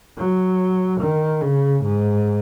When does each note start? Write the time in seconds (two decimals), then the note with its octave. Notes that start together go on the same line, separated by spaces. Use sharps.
0.17 F#3
1.00 D#3
1.42 C#3
1.83 G#2